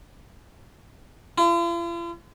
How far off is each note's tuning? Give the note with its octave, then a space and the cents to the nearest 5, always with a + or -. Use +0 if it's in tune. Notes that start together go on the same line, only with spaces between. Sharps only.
F4 -45